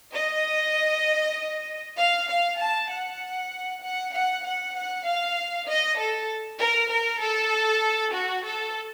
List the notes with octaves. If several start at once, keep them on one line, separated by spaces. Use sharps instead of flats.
D#5
F5
F5
A5
F#5
F#5
F#5
F#5
F#5
F5
D#5
A4
A#4
A#4
A4
F#4
A4